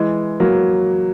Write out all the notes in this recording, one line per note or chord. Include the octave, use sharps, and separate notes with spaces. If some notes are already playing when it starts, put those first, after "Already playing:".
Already playing: E3 G#3
F#3 A#3